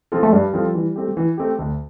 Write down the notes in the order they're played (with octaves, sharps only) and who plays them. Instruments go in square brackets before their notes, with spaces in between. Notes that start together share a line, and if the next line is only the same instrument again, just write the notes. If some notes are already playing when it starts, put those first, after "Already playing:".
[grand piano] F3 C4 F4 A4
[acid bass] A3
[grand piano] G2 [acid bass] G3
[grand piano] F3 C4 F4 A4
E3
A3 C4 G4
E3
A3 C4 G4
D2